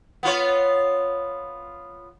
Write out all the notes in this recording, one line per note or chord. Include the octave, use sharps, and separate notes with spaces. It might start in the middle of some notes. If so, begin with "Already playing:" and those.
B3 F4 C#5